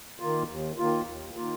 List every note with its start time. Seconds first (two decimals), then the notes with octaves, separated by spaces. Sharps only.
0.20 D#3 A#3 F4
0.49 D#2
0.78 D#3 A#3 F4
1.07 D#2
1.36 D#3 A#3 F4